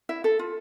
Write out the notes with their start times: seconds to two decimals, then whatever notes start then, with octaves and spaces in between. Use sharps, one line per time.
0.09 E4 E5
0.24 A4
0.39 F4